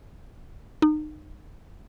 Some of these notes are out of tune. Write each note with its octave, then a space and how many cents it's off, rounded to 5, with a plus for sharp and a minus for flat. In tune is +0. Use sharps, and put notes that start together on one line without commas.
D#4 -30